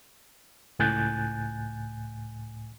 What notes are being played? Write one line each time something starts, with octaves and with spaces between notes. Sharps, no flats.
C#2 A2 G#5 F#6 G6 A6